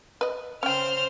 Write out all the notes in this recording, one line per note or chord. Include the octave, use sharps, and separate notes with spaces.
B4 D#5
C#3 C#4 C5 G5 F6